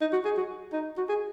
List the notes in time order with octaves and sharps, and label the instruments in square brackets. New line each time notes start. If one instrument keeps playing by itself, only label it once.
[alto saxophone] D#4
F#4
G#4
F#4
D#4
F#4
G#4